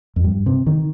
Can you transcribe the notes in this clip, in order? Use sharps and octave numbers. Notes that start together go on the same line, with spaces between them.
F2
G2
C3
D#3